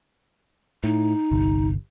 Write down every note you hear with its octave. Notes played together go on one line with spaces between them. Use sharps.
A2 D#4
G1 C2